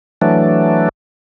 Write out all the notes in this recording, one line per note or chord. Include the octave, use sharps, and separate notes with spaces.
E3 F#3 A3 D4